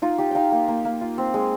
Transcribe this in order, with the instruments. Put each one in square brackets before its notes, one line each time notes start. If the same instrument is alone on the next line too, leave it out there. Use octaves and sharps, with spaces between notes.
[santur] D#4 F4
D#4 G4
D#4 F5 G5
A#3
A#3
A#3
F4
C4
G#3